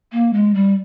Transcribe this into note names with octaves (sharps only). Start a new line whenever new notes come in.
A#3
G#3
G3